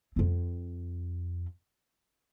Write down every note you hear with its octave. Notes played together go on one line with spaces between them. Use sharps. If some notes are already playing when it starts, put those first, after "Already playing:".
F2 C4